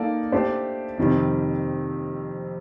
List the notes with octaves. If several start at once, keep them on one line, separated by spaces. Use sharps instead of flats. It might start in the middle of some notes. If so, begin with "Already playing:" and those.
Already playing: A#3 D#4 A4 D5 F5
A3 D4 G4 C5
F2 C3 D#3 G3 C4